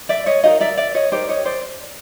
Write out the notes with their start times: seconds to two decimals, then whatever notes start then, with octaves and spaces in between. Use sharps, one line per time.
0.09 D5 E5
0.26 C#5 D#5
0.43 D#4 G4 A#4 D#5 F5
0.61 D5 E5
0.77 D5 E5
0.95 C#5 D#5
1.12 D#4 G4 A#4 C5 D5
1.29 C#5 D#5
1.45 C5 D5